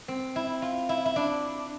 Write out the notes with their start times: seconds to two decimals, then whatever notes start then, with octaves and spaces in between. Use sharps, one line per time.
0.08 C4
0.36 E4
0.62 F4
0.89 E4
1.05 E4
1.16 D4